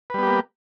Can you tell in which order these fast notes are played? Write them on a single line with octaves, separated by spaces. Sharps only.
B4 G3 B3 G4 A#3